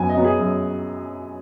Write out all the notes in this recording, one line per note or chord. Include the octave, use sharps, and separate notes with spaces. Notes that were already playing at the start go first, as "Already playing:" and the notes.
Already playing: F#2 F#3 B3 G#5
D#5
F#3 B3
G#4
F#2